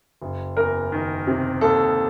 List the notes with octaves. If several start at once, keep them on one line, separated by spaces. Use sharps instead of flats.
F#1
E2 A#4
D#3
C3
D#2 A4